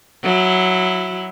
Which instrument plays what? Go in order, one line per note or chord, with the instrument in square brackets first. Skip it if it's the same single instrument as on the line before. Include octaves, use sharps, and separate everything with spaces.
[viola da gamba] F#3 E4